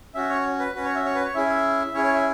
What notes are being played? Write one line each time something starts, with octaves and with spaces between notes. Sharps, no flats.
C#4 F#4 E5
C#5
B4
C#4 F#4 B4
C#5
E5
C#5
B4
C#5
C#4 E4 G#4 E5
E5
C#4 E4 G#4 C#5
C#5
E5